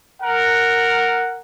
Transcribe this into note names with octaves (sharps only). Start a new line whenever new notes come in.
A#4 F#5